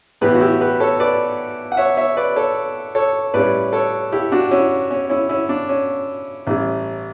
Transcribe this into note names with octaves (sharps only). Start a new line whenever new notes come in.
A2 E3 B3 G4 B4
F#4
E4 G4
G4 B4
A4 C#5
B4 D5
F#5
C#5 E5
C#5 E5
B4 D5
A4 C#5
A4 C#5
A2 G3 C#4 B4 D5
A4 C#5
E4 G4
D4 F#4
C#4 E4
C#4
C#4 E4
C#4 E4
D4
C#4
A1 A2 G3